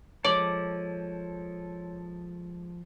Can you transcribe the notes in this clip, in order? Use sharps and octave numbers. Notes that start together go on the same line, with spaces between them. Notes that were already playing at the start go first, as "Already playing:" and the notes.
F3 G#3 A4 C#5 D5